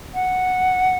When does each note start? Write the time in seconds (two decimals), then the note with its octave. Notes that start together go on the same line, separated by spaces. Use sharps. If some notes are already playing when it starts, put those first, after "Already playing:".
0.14 F#5